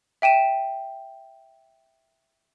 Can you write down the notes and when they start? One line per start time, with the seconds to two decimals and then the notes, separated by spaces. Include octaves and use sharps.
0.22 E5 G5 D#7 E7